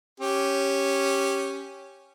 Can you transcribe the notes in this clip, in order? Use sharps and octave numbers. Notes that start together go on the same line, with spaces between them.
C#4 G4